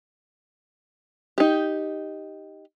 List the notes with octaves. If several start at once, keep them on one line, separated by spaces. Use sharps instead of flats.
D#4 G4